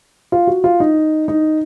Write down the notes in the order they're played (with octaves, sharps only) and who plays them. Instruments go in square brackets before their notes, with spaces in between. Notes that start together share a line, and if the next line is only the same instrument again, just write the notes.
[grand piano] F4
F#4
F4
D#4
D#4